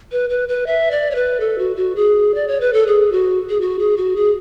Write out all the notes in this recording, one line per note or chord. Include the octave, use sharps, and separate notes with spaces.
B4
B4
B4
E5
D5
C#5
B4
A4
F#4
F#4
G#4
D5
C#5
B4
A4
G#4
F#4
G#4
F#4
G#4
F#4
G#4